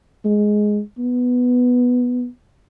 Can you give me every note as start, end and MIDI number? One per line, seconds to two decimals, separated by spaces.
0.25 0.81 56
0.98 2.26 59